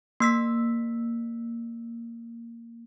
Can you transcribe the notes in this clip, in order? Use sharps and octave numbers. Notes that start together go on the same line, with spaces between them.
A#3 E6 B6